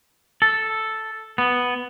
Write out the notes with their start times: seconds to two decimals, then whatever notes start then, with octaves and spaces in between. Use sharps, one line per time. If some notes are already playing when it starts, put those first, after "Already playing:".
0.42 A4
1.38 B3